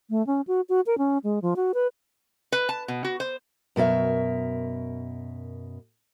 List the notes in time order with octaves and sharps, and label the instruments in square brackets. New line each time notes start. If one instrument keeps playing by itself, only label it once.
[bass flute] A3
C#4
F#4
F#4
A#4
C#4
G#3
F3
F#4
B4
[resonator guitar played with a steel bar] B4
A5
B2
F#4
C5
[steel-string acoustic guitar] F#2 B2 A#4 E5